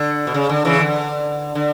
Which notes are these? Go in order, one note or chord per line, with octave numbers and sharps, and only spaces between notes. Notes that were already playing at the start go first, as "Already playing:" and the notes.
Already playing: D3
B2
C#3
D3
C#3 E3
D3
D3